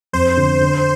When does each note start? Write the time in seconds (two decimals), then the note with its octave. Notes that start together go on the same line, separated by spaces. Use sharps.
0.13 F2 C5
0.37 D3
0.61 D3